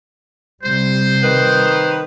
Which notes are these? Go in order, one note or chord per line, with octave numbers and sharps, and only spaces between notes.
C3 G3 C5
D#3 B4